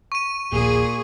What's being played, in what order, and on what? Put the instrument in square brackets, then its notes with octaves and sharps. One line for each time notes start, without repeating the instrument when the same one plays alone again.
[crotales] C#6 D#7
[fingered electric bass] D#1 A#1 [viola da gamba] A#2 [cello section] G#4